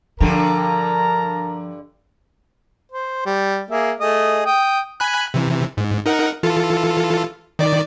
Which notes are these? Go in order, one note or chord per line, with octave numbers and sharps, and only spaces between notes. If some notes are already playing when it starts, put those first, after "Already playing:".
G2 D3 F3 A#4 A5 A#5
C5
G3
A#3 G#4 E5
A3 G#4 D#5
G5 D#6
G#5 B5 F#6
C3 E3
G#2
D#4 A#4 F#5
E3 F4 A4
D#3 D5